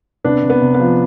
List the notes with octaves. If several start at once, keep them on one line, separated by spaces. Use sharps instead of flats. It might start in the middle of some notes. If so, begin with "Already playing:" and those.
C3 B3 D4
C3
B3
C3
B3
F3